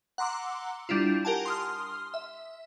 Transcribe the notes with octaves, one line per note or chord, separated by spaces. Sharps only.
F#5 A#5 C6 D6 E6
G3 D4 E4 F4
G4 A#4 F#5 G#5 A5
C6 D#6 F6
E5